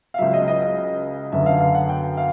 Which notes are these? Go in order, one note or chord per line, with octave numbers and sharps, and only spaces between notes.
F5
C#2 C#3 F#3 E5
D#5
D#5
D#5
F#2 D3 F#3 B3 E5
F5
F5
F#5
G5
F5